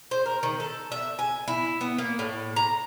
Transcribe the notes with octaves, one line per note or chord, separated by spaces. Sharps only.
C5
A#4
D#3
A4
E5
G#5
E4
B3
A#3
A2
A#5